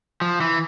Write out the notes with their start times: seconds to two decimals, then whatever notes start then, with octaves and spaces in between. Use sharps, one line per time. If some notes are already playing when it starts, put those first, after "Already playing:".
0.21 F3
0.41 E3